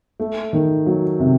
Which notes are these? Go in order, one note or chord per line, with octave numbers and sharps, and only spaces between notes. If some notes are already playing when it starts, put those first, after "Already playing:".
A3
D#3
F#3
C3